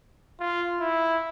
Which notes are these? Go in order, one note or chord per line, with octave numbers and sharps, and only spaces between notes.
F4
E4